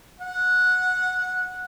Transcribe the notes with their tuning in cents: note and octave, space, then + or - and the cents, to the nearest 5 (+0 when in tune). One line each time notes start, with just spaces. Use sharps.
F#5 -15